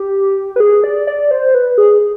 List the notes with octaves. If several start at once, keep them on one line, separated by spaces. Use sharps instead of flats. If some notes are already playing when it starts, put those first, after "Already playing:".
Already playing: G4
B4
G#4
D5
D5
C5
B4
G#4